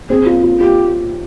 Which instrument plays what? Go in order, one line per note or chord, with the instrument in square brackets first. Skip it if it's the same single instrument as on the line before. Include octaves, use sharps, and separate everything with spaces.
[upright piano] C4 [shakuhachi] G#4
[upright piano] F4
F4
[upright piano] F4 [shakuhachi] G4